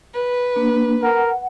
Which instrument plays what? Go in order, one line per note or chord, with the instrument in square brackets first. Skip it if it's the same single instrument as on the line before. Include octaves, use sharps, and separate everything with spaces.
[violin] B4
[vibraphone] A#3 D4
[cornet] A#4 [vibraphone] F#5